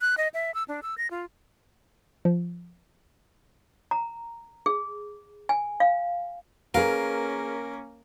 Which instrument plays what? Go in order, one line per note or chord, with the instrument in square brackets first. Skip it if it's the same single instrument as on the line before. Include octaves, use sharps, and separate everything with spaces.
[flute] F#6
D#5
E5
E6
D4
E6
A#6
F4
[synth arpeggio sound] F3
[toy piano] A#5
G#4
G#5
F5
[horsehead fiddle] A#3 C#4 [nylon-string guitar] G#4 B4 F5 [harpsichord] A#4